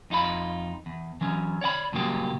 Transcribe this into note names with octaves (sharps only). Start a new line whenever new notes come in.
F2 D#4 F4 G4 B5
E2
E3 F#3 C#4
C#5 D5 F#5 B5
G2 A#2 C#3 F#3 A#3 G4